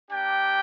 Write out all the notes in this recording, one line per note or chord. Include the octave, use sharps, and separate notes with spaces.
A#3 D4 G4 G5